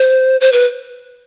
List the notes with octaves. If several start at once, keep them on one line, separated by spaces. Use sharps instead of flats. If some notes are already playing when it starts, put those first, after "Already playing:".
Already playing: C5
C5
B4